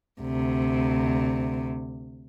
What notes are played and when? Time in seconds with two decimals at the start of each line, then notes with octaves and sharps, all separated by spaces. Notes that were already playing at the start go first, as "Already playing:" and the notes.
0.22 D2 C3